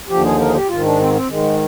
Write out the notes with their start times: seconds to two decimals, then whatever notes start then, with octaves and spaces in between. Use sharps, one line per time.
0.09 D#2 D3 F3 G4
0.23 G#4
0.39 A#4
0.48 G#4
0.54 G4
0.69 G#2 D#3 F4
0.84 D4
0.99 C4
1.14 C4
1.29 G#2 D#3 G#3